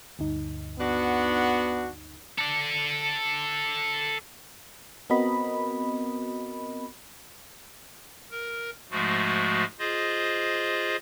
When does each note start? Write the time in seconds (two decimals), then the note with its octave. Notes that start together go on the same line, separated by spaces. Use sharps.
0.19 D2 G2 D#4
0.79 B3 D4 F#4
2.38 A4 D5
5.10 B3 C4 F#4 A#4 D#5 B5
8.31 A#4
8.91 G#2 F3 G#3 A3 F#4
9.79 F4 G#4 C5 D#5